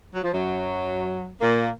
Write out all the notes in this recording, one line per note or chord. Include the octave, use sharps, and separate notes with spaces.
F#3
F3
F#2 F#3
A#2 A#3